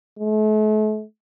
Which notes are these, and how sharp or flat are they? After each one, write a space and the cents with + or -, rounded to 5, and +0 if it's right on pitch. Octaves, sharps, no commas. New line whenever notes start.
A3 -40